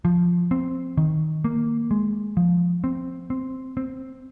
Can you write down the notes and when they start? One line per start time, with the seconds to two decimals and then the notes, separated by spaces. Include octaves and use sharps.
0.05 F3
0.51 C4
0.97 D#3
1.45 A#3
1.91 G#3
2.37 F3
2.84 C4
3.30 C4
3.77 C4